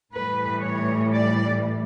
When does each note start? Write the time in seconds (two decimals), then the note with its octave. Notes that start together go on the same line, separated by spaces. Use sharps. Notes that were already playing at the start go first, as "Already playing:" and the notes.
0.12 A2 E3 G3 B4
0.63 C#5
1.12 D5